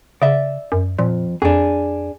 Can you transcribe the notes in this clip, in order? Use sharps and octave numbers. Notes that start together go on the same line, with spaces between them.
C#3 D5 E5
F#2
F2 A#2
F2 D4 G#4